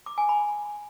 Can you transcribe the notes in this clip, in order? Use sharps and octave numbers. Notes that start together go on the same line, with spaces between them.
D6
G#5
B5